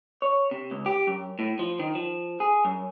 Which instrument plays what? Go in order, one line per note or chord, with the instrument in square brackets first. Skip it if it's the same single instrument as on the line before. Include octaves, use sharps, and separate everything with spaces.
[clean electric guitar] C#5
C3
C#2
G4
F#2
A2
F3
D#3
F3
G#4
F#2